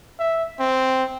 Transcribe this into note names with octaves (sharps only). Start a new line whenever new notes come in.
E5
C4